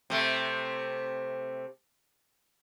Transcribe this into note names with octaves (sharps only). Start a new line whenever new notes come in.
C3 A3